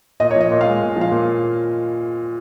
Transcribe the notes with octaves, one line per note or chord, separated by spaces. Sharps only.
A#2 D#5
F3 C#5
D#5
A#2
F5
G#3
A#2
F3
F5
A#2